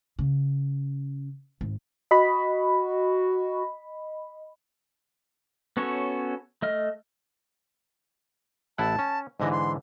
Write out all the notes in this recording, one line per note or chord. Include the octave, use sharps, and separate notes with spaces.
C#3
G#1
F#4 D#5 B5
B3 C#4 F#4 A4 C#5
A3 D#5 F6
A1 E4 F#5 A5
C#4
G#2 D3 E3 D#5
C6